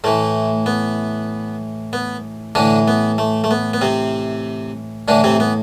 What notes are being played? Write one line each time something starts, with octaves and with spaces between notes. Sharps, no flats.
A2 E3 A3
B3
B3
A2 D3 E3 D4
B3
A3
A3
B3
B3
C3 C4
A2 D3 E3 D4
C3 C4
B3